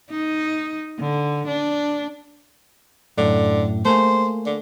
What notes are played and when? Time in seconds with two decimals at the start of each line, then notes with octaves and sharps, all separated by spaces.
0.10 D#4
0.99 D3
1.47 D4
3.17 F#2 A2 D3
3.85 A3 A#3 G#4 C5
4.46 D3